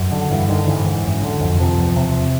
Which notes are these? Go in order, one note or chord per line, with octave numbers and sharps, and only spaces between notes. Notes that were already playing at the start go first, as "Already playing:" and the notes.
Already playing: F#2
D3
G2 E3
D3 D#3
G#2 E3
G#2
F#2
D3
F2
C3 F3
E2
C3